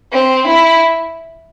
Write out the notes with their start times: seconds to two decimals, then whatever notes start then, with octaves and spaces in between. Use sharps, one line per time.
0.12 C4
0.46 E4